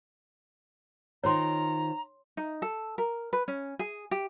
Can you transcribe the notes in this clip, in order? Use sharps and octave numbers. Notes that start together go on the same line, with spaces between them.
D#3 F4 C5 C#5 A#5 C6
D#4
A4
A#4
B4
C#4
G#4
G4